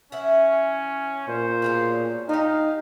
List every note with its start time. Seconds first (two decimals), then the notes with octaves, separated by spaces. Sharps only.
0.12 E3 C#4 E5 F#5
1.28 A#2 C5
1.62 B2 G#3 C#4
2.29 D#4 G4 F5 G#5